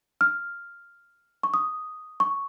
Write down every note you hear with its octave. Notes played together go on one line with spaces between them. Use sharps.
F6
C#6
D#6
C#6